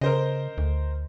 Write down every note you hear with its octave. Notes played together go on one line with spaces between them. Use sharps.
C#3 A#4 C5 D#5
D2